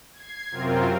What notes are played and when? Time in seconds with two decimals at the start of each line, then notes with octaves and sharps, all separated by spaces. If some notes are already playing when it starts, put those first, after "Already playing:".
0.13 G#6 C7
0.51 F#2 C3 C4 F4 A#4